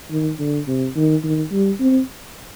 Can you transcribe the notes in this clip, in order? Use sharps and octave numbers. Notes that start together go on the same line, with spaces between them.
D#3
D3
C3
D#3
D#3
G3
C4